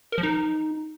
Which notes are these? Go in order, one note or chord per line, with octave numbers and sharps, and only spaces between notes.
A#4
F3
D#4